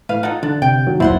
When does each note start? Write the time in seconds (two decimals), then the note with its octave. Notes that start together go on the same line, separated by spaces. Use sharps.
0.09 A2 B4 F5
0.23 D#4 F4 A4 F#5
0.43 D3 D4 F#6 A6
0.62 C3 G5
0.87 D#3 F#3
1.00 D1 F#2 A#2 F3 E4 C5 F#5 C6